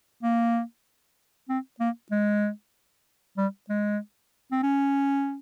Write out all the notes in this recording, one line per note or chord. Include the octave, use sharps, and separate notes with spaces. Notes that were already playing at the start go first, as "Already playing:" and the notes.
A#3
C4
A#3
G#3
G3
G#3
C4
C#4